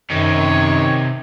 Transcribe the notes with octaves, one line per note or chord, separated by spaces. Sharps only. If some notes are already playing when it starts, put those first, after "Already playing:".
F#2 C3 D#3 D#4 C#5